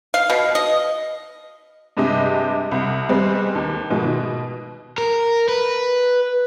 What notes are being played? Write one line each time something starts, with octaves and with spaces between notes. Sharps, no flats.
F5
B2
D#5
G2 C3 G#3 G4 D#5
C2 C3
G3 G#3 B3 C4
D#2
G#2 B2 D#3 F3 G#3 A#3
B2
A#4
B4